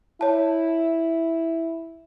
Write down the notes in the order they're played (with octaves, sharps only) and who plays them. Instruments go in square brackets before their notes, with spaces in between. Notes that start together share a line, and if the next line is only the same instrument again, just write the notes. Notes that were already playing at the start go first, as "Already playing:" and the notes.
[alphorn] E4 [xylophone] C#5 A5